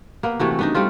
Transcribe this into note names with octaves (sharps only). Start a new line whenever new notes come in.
A#3 B3
C3 E3 A3 F#4
B3 D4 D#4
G3 A3 C4 F4